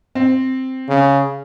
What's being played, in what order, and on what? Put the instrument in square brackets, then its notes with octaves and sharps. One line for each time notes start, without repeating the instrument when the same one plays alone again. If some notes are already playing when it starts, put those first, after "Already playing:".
[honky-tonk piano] C4
[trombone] C#3